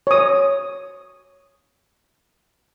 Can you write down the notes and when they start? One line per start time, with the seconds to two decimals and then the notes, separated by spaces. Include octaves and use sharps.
0.07 C#5 D#6